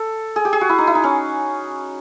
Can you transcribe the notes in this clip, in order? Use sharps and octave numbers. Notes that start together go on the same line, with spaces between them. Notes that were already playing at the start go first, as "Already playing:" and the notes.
Already playing: A4
G#4
G4
G#4
F#4
E4
D#4
E4
D#4
C#4